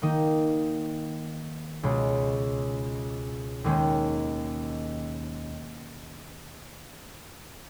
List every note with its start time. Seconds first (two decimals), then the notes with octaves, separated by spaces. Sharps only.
0.02 D#3 A#3 D#4
1.83 C#2 B2 G#3 C#4
3.64 D#2 D#3 G#3 C#4